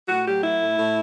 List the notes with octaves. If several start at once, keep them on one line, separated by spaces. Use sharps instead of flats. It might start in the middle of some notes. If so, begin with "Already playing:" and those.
A2 F#4
F#3 G4
A3 E4
A2
A2